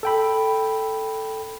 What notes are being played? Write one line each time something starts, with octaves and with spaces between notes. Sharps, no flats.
A4 G5 B5